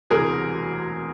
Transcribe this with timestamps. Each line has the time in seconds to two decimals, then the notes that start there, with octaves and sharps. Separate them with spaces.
0.10 E1 D2 C3 E3 G3 G#4 A#4